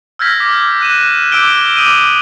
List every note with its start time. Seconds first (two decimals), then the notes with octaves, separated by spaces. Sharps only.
0.19 E6 F6 G6 G#6 A#6 B6
0.40 D6 G#6
0.80 F#6 D#7 E7
1.32 D6 E6 G6 D7 G7
1.77 D6 D#6 D#7